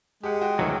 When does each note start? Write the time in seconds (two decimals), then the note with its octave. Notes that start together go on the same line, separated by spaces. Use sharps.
0.23 G#3 G4 F#5
0.41 F#4 G5
0.59 D2 D#3 E3 F#3